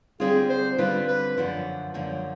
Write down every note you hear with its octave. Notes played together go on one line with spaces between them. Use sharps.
D3 G3 C4 F4 G#4
C5
D3 G3 C4 F4 B4
B4
F#2 D3 F3 A#3
F#2 D3 F3 A#3